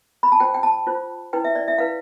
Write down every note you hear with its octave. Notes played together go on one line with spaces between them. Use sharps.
B5
A5
F4 C5 G5
G5
A5
F4 C5
E4 B4 G5
E5
D5
E5
E4 B4 F5